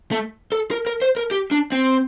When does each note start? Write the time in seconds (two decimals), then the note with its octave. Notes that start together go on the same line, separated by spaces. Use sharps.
0.12 A3
0.52 A4
0.71 A#4
0.86 A#4
1.02 C5
1.17 A#4
1.31 G4
1.51 D4
1.72 C4